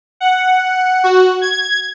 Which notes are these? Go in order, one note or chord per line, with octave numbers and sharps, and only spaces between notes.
F#5
F#4
G#6